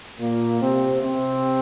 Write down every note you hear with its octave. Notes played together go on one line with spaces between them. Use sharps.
A#2 A#3
C3 C4
C3 C4